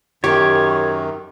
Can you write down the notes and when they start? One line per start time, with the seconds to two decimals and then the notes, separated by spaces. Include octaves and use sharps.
0.24 F#2 D#3 G4 C#5